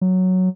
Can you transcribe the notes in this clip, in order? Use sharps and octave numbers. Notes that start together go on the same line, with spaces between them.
F#3